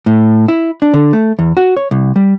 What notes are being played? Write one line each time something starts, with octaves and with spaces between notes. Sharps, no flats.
A2
E4
D4
D3
A3
E2
F#4
C#5
C2
G3